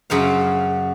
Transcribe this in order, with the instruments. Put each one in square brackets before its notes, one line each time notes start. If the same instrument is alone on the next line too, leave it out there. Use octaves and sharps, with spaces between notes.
[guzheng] F#2 C#3 C5 F5